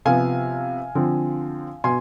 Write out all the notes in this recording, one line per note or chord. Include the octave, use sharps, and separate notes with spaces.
C3 F3 B3 F5 G#5
D3 F3 C4
B2 G#5 C6